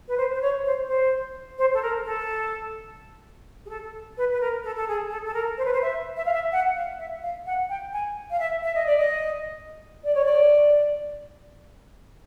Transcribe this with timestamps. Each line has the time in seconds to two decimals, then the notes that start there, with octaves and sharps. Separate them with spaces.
0.08 B4
0.17 C5
0.34 C5
0.42 C#5
0.65 C5
0.88 C5
1.59 C5
1.74 A4
1.82 A#4
2.05 A4
3.66 G#4
3.69 A4
4.18 B4
4.31 B4
4.41 A#4
4.64 A4
4.76 A4
4.88 G#4
5.10 A4
5.26 A4
5.34 A#4
5.58 C5
5.65 B4
5.73 C5
5.82 E5
6.17 E5
6.25 F5
6.33 E5
6.52 F#5
6.75 F5
6.99 E5
7.22 F5
7.46 F#5
7.70 G5
7.93 G#5
8.31 F5
8.40 E5
8.63 E5
8.75 D#5
8.86 D5
8.97 D#5
10.04 D5
10.15 C#5
10.25 D5